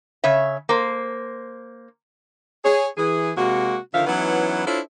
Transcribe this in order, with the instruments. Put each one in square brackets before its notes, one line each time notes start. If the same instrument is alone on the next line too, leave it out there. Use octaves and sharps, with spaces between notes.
[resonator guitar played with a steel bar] C#3 C#5 E5
A#3 C5
[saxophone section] G#4 C#5
E3 G#4
C3 G#3 A#3 F#4
D3 D#3 F3 E5 F5
E3 F#3 B3 C#4 D#4 E4
D4 E4 F4 A4 C5 C#5